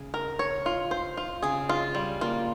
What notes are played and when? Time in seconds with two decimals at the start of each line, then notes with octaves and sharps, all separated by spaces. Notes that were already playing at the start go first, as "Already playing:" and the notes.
Already playing: C#3
0.14 A#4
0.39 C#5
0.66 F4
0.91 C5
1.17 F4
1.43 C#3 G#4
1.69 F4
1.95 G3
2.21 A#3 F4